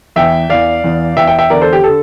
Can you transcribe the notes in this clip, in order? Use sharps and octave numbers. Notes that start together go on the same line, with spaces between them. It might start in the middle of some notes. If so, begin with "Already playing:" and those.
E2 E3 E5 G5
E2 E3 D5 F5
E2 E3
E2 E3 E5 G5
E5 G5
E5 G5
E2 D3 A#4 D5
A4 C5
G4
D3 A4